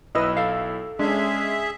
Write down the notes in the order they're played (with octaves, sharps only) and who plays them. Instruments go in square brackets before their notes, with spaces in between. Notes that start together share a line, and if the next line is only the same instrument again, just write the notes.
[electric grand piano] B1 E4 E6 [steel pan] B4 D#5
[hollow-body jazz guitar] A4 F5
[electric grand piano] G#3 C#4 [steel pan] D4 [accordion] G#4 E5